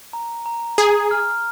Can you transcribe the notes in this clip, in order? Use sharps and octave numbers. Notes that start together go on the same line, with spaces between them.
A#5
A#5
G#4 A#5
F6